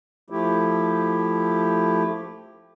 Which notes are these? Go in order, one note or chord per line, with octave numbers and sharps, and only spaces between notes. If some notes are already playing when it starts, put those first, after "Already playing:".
F3 A3 E4 G4